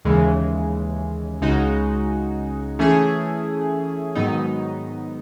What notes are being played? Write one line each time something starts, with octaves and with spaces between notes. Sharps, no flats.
D#2 C#3 E3 G#3
C#2 C#3 G#3 D#4 F#4
E3 A3 C#4 E4 G#4
G#2 D#3 F#3 B3 D#4